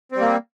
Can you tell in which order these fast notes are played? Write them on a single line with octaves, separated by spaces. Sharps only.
C4 G3 A#3